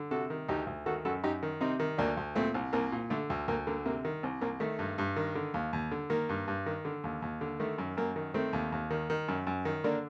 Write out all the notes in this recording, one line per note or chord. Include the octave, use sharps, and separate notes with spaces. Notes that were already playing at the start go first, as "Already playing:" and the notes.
Already playing: D3
C3 F#4 A4
D#3
D2 D#4 G4
D2
D#3 F#4 A4
F#2 F#4 A4
F#2 D#4 G4
D#3
C3 C4 D#4
D#3
D2 A#3 D4
D2
A#2 A3 C4
C2
C2 A#3
A#2
D3 A3
D2
D2 A#3
D3 A#3
C3 A#3
D#3
C2
C2 A#3
D#3 A3
G2
G2
D#3
D3
D#2
D#2
D3
D#3 A#3
G2
G2
D#3
D3
D#2
D#2
D3
D#3 A3
F#2
F#2 A#3
D#3
D#3 A3 C4
D#2
D#2
D#3
D#3
F#2
F#2
D#3
D3 A#3 D4